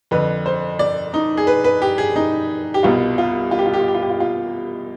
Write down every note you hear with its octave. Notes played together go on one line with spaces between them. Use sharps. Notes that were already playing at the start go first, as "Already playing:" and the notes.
F2 D3 B4
C5
D5
D#4
G#4
B4
B4
G4
G#4
D#4
G4
C2 B2 F4
F4
F4
G4
F4
G4
F4
G4
F4
G4
F4
F4